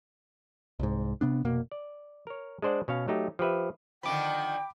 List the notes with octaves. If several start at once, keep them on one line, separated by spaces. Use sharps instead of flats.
C2 G#2
C3 B3 D4
F1 B2 A#3
D5
A#4 C#5
G#3 D4 C5 D5 F#5
B2 C#4 C#5 F5
F#3 A3 D#4 G4
F3 G4 B4 E5
D3 D#3 F3 G5 B5 D6